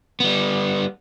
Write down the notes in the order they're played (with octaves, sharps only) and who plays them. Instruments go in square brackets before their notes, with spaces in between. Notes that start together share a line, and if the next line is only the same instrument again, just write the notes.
[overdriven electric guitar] G3 B3